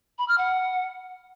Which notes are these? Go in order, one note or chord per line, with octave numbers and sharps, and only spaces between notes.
B5
F6
F#5